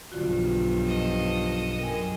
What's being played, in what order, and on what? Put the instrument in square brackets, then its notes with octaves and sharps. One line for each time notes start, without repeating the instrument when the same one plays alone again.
[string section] B1 [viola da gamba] G2 F3 [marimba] D3 F4 F#4
[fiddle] A4 D#5
[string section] F#2 G#4 [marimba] A#4 G5 G#5